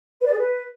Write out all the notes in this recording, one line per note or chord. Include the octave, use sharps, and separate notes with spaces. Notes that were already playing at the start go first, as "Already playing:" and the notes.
B4
D5
G#4
B4